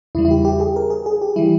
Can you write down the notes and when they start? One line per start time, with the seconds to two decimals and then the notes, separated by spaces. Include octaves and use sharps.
0.15 E2 C#3 G3 E4
0.25 E4
0.31 G4
0.45 G4
0.60 G#4
0.76 A#4
0.90 G#4
1.06 G#4
1.22 G4
1.36 E3 G3 E4